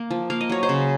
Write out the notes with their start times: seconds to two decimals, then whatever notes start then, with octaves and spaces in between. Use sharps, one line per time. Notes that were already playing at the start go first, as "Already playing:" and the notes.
Already playing: A#3
0.11 F3
0.30 A#3 F5
0.41 D#5
0.50 F#3 C#5
0.63 C5 D#5
0.69 C#3